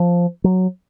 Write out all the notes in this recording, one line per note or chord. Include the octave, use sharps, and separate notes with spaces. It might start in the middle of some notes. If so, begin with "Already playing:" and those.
Already playing: F3
F#3